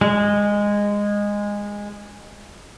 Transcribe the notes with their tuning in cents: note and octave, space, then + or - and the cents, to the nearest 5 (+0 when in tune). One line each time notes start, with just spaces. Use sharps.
G#3 -15